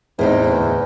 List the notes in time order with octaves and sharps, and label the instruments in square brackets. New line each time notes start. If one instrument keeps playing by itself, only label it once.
[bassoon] E2 [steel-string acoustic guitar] A2 C4 D#4
[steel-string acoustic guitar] D2 G#2